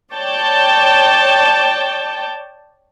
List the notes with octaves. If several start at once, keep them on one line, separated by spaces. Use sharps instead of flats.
C#5 D5 G5 A5